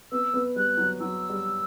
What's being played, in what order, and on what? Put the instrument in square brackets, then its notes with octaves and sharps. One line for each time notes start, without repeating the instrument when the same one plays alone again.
[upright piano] B3 [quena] E6
[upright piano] B3
[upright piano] G3 [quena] F#6
[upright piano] F#3
[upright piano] F#3 [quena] E6
[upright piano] G3